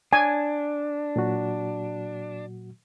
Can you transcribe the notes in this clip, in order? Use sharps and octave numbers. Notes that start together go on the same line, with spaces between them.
D4 G#5
A#2 F#3 F#4